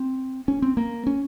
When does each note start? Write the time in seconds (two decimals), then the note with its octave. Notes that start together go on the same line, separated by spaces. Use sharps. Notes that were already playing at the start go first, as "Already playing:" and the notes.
Already playing: C4
0.48 C#4
0.62 C4
0.77 A#3
1.07 C#4